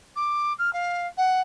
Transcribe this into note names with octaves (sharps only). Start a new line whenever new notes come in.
D6
F6
F5
F#5